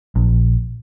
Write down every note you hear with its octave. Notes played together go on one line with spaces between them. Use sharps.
A#1